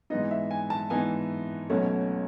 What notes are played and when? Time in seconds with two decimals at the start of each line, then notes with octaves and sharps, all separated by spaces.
0.10 G#2 E3 B3 D#4 D#5
0.31 E5
0.51 G#5
0.70 A5
0.90 G#2 E3 B3 D#4 G#5
1.70 B1 B2 A3 C#4